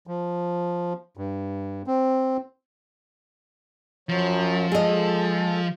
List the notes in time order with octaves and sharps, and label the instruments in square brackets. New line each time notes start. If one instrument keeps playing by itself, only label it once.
[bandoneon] F3
G2
C4
[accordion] F#2 F#3 [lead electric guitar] F3
[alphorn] G#3 [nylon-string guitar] G#4 D#5 [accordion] A4